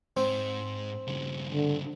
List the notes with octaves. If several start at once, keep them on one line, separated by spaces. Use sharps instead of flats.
G#2 C4
G2 C#3
D3